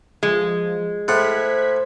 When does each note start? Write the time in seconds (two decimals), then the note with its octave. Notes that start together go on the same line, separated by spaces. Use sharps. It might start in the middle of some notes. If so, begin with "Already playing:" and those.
0.23 F3 G#3
1.08 A2 C5 F#5 F#6 G#6 B6